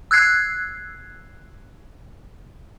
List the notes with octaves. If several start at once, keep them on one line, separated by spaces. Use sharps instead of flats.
E6 F#6 G#6 C7